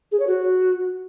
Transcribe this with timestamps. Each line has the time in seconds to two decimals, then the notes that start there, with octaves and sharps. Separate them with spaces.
0.12 G#4
0.20 C#5
0.27 F#4